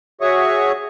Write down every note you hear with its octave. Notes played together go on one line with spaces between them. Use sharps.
F#4 G#4 C#5 E5 C#6 D#6